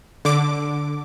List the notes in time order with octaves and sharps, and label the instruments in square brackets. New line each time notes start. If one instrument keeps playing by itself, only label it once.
[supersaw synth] D3 D6